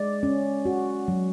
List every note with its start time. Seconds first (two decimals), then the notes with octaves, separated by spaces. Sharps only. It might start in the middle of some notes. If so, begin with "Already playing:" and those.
Already playing: G#3 D5
0.23 C#4
0.65 F#4
1.08 F#3